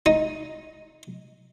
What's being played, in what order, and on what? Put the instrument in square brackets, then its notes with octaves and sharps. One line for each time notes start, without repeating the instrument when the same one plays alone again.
[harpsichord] D#4